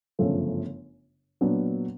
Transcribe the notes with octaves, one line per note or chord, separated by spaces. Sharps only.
G1 F#2 C#3 F3 A3
A#2 F#3 B3 D4